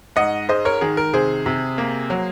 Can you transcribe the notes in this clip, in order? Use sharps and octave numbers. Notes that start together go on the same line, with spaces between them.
G#2 D#5 F#5
G#3 C5 D#5
A#4 C#5
D#3 G#4
A#4
C3 G#4 C5
C3
A#3
F#3